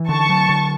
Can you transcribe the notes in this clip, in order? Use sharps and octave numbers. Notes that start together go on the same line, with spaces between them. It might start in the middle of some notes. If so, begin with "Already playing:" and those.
Already playing: E3
D3 A5 C#6
F#3
D3